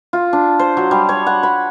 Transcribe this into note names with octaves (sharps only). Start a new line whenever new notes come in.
F4
D4
C5
F#3
G3
C#5
F#5
B5